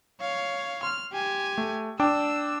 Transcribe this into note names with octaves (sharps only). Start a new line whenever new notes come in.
C#5 F5
C6 F6
G4 G#5
A3
D4 G5 D6 E6